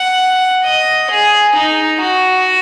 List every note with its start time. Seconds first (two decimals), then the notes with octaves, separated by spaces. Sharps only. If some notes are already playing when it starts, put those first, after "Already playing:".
Already playing: F#5
0.64 D#5
1.10 G#4
1.55 D#4
2.01 F#4